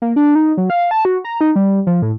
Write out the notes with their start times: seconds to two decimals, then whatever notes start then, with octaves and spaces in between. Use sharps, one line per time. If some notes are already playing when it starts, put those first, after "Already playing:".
0.02 A#3
0.16 D4
0.35 D#4
0.57 F#3
0.70 F5
0.91 A5
1.05 F#4
1.25 A#5
1.41 D#4
1.56 G3
1.87 F3
2.02 A2